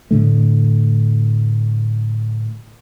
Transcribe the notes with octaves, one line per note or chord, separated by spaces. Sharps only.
A2 D3 A3